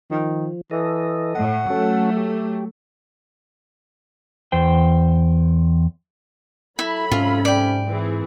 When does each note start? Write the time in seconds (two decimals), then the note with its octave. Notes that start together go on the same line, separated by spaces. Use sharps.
0.11 D#3 F3
0.71 E3 A4 D#5
1.35 A2 F#5
1.70 F#3 A3 C#4 F#4 A4
2.17 G4
4.52 E2 C5 G5
6.79 F#3 E4 A4 B5
7.11 G#2 C3 C#4 F4
7.45 D5 G5
7.87 E3 C4 G#4